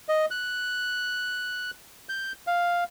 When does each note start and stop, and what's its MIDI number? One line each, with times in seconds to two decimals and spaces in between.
0.09 0.26 75
0.31 1.71 90
2.09 2.32 91
2.47 2.84 77